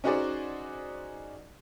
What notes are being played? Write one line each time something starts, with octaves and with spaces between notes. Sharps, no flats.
C#4 D#4 F#4 G#4 C5 D5